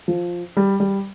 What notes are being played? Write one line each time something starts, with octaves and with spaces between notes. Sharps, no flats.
F3
G3
G3